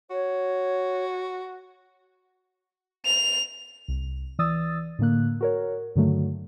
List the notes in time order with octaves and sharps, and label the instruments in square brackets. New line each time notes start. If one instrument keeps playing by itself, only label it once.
[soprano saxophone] F#4 [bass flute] C#5
[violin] F7
[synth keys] C2
E3 D5 D#6 E6 A6
A2 D3 A#3 F#6
F#4 A#4 C#5
G2 D3 D#3 F#3 A3